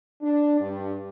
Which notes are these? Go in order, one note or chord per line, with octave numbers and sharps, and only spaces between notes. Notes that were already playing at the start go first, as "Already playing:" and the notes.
D4
G2